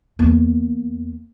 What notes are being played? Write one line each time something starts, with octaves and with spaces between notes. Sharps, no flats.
E2 A#3